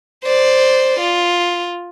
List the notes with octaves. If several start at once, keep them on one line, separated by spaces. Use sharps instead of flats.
C5 D5
F4